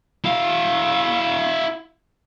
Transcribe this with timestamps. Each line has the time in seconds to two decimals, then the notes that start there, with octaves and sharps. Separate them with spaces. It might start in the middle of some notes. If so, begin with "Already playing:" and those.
0.24 E4 F5